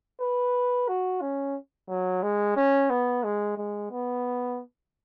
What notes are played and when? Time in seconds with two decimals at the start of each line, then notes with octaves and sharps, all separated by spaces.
0.20 B4
0.88 F#4
1.21 C#4
1.89 F#3
2.23 G#3
2.56 C#4
2.90 B3
3.24 G#3
3.57 G#3
3.91 B3